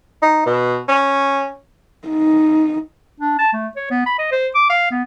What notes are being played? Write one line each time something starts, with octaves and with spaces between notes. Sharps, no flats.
D#4
B2
C#4
D#4
D4
A5
A3
C#5
B3
B5
D#5
C5
D6
F5
B3